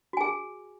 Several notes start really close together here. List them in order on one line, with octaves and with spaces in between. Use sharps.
F#4 G#5 G#4